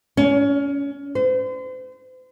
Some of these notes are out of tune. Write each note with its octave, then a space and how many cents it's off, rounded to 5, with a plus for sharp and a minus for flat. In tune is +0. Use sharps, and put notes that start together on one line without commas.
C#4 +25
C5 -40